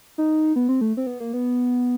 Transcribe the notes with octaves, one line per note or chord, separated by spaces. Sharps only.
D#4
B3
C4
A3
C4
B3
A#3
B3